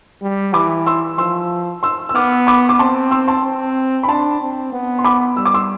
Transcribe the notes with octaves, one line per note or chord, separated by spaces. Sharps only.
G3
E3 B5 D6
C6 E6
F3 C6 E6
C6 E6
E6
B3 D6 F6
B5 D6
D6
C4 A5 C6
C6 E6
A5 C6
C4
B5
D4 A5 C6
C4
B3
C6
B5 D6
G3 E6
D6
C6 E6